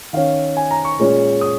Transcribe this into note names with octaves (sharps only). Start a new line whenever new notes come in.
D#3 C#4 F5
G#5
A#5
C#6
A#2 G#3 C#4
D#6